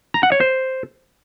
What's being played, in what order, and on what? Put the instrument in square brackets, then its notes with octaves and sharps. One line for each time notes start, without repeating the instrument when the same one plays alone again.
[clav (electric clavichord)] A#5
F#5
C#5
C5